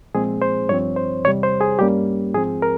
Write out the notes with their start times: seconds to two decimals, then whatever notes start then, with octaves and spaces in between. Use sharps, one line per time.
0.15 A#2 F3 G#3 C4 G#4
0.42 C5
0.69 G2 F3 C4 C#5
0.96 C5
1.24 E2 C3 G3 C#5
1.43 C5
1.61 G#4
1.79 G2 G3 A#3 C#4 G4
2.34 G#2 F3 C4 G#4
2.62 A#4